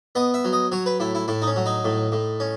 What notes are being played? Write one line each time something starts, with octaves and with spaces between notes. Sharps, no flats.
B3 D#5
E5
F#3
D#5
F#3 C#5
B4
A2 E4
E4
A2 E4
D#4
C#4
F#3
D#4
A2
A2
C#4